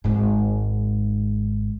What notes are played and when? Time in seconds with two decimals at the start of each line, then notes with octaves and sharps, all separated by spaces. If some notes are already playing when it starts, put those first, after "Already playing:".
0.04 G#1 G#2